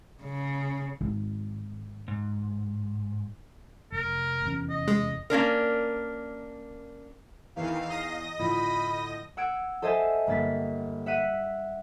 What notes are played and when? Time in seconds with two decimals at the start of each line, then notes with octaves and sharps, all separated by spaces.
0.23 C#3
1.01 G#1
2.08 G#2
3.92 F1 A#4
4.43 F1 E2 C#4
4.69 D#5
4.88 G#3
5.30 A#3 C#4 D4 A#4
7.56 E2 D#3 E3 F5
7.89 D#5 D#6 A#6
8.39 A2 D3 F3 B5
9.37 F#5 E6 G#6 D7
9.82 A4 C5 D#5 E5 G#5 A5
10.27 G1 A#3 A6 B6
11.06 E5 F#5 F#6 B6 D#7